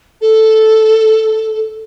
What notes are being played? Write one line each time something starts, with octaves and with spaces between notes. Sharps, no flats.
A4